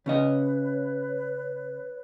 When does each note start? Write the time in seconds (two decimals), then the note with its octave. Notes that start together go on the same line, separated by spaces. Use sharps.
0.06 C#3 C#4 B4 C#5 D#5